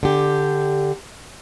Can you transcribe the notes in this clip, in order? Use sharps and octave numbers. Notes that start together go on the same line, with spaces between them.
D3 G4